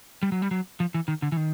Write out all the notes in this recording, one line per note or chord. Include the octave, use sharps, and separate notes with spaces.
G3
F#3
G3
F#3
F3
E3
D#3
D3
E3
D#3